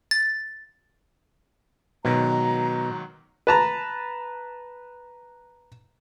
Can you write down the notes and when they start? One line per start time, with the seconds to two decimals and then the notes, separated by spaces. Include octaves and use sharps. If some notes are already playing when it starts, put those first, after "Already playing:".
0.11 A6
2.05 G#2 B2 D#3 F#3 A#5
3.47 B4 A5 A#5